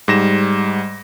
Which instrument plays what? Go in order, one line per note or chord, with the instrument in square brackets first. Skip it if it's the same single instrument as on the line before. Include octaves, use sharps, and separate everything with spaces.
[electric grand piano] G#2 G3 A#6 E7